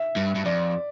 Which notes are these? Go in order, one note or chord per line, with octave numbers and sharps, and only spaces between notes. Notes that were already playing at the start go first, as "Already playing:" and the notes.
Already playing: E5
G2
G2
F2 D5